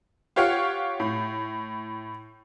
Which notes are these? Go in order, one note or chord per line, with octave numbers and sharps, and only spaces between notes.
F4 G4 C#5 F5 F#5
A2